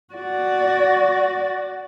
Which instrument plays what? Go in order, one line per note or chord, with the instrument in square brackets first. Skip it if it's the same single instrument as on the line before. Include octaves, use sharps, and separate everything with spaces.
[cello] F#4 D5